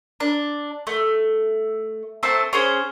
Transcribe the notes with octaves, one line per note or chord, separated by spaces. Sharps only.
D4
A3
A3 C4 C5 A5
C#4 G#4 C5